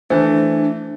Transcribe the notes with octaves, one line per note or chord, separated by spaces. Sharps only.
E3 A3 D4 C5